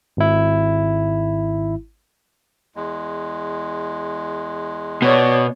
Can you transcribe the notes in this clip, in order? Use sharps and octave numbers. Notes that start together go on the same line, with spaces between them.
G#1 E4
E2 G#3
B2 C#5 D5